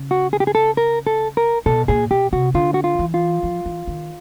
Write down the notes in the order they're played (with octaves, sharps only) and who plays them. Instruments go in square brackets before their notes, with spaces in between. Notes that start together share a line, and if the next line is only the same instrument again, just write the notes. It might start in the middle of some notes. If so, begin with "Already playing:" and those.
Already playing: [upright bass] C#3
[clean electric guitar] F#4
G#4
G4
G#4
A4
A#4
A4
A#4
[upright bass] B2 [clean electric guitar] A4
[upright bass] A#2 [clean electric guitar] G#4
[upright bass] B2 [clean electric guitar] G4
[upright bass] C3 [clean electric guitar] F#4
[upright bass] D3 [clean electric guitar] F4
[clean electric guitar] F#4
F4
[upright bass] E3
[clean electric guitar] F4
[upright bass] F3
E3
D#3